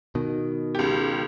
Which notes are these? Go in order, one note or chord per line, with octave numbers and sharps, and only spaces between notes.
B2 D#3
C#2 G4